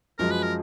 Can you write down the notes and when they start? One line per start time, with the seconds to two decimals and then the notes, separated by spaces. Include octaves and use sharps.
0.19 F#2 F3 G#3 A#4
0.31 B4
0.43 A#4